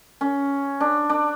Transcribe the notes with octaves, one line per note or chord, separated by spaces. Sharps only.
C#4
D4
D4